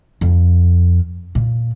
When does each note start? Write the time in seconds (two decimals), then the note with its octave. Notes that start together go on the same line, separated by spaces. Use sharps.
0.21 F2
1.35 A#2